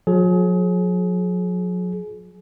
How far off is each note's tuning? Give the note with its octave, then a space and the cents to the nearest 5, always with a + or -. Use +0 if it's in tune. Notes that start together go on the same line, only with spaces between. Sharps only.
F#3 -45 G#4 +30